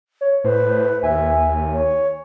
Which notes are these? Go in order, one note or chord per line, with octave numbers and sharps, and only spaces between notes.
C#5
A2 B4 C5
D#2 E5 G#5
C#5